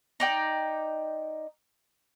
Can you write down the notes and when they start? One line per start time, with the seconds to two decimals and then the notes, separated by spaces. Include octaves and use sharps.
0.20 D#4 D5 G5